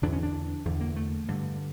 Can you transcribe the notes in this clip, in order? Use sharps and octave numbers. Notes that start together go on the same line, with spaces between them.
E2 D3 D4
C#4
D4
E2 D3
A#3
A3
G2 D3